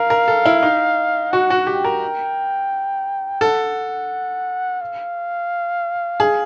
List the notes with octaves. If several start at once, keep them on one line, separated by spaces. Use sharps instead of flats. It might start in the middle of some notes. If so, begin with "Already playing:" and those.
Already playing: A#4 F5
A#4
A4
E4
D#4
F#4 F#5
F#4
G4 G5
A#4
A4 F#5
F5
G#4